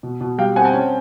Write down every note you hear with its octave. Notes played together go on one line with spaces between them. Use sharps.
B2
B2
G3 F5 G5
C4 F#5 G#5
G5 A5
C#4